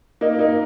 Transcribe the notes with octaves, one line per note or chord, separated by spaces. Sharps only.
A#3 D#4
A#3 D#4